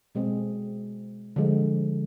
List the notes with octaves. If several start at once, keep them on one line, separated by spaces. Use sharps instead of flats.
B2 G#3 C4 G#4
D3 F3 G#3